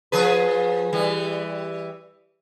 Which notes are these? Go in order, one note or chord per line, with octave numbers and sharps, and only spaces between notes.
F3 G#4 B4
E3 G3